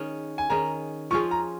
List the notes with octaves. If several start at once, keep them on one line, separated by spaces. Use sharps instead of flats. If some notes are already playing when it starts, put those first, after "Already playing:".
Already playing: D#3 C#4 G#4
G#5
D#3 C#4 G#4 A#5
F3 C#4 F4 G#4 C#6
A#5